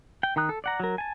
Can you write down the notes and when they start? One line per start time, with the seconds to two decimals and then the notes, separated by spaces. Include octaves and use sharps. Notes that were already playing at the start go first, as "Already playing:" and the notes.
0.23 G5
0.36 D#3 G5 A#5 D#6 F#6
0.49 A4
0.64 D5 F#5 A#5
0.80 F#3 A#4
0.98 G#5 A5